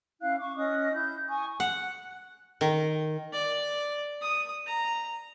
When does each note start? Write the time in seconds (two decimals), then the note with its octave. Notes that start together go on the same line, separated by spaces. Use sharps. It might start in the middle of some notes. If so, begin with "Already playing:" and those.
0.22 C#4 E4 F5 F#6
0.40 C#6 D6
0.57 C#4 D#5 D#6 F#6
0.93 E4 G6
1.29 G#5 C#6 D#6
1.60 F#5
2.61 D#3
3.33 D5
4.21 D#6
4.66 A#5